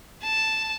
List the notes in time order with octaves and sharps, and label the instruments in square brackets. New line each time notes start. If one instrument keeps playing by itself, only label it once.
[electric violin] A5